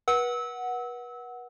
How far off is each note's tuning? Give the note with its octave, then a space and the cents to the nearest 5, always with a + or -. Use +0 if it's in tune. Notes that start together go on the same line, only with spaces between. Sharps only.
B4 -35 F#5 +0 E6 -25